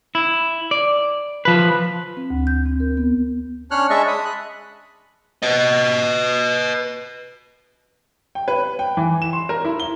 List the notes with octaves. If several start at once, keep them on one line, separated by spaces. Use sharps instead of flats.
E4
D5
F3 B4
C4
D2
G6
C4
A#4
B3
C#4 D4 C#5 F6 F#6
G#3 D4 D#5 E5 A5 C#6
B5 D#6
F#6
B4 D#5
G5
B4
G5
E3
E7
C6
A#4
E4
G7